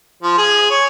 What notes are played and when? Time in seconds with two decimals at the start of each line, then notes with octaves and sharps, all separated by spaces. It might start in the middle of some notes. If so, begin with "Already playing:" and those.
0.23 F3
0.38 G#4
0.71 C#5